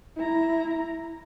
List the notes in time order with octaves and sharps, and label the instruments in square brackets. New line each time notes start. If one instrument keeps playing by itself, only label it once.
[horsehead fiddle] E4 A#5